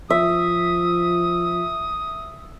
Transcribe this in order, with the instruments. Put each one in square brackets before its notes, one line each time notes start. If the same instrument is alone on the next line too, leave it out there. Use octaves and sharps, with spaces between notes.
[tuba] F3 [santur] E5 [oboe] D#6